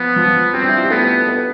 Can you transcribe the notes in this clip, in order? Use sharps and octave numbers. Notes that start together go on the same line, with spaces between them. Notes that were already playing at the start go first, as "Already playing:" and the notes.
Already playing: F3 B3 F4
F3 F4
G3 C4 G4
D4
E4
F4
G4
A3 B3 A4
B3 B4